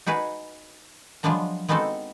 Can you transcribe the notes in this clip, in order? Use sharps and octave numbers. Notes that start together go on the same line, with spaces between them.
D#4 F#4 G#4 B4
F3 F#3 G#3 B3 D4 A#5
G#3 B3 C4 D#4 F#4 A4